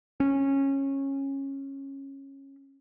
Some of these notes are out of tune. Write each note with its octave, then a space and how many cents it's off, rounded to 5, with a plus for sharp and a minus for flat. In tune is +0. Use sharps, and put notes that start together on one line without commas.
C#4 -20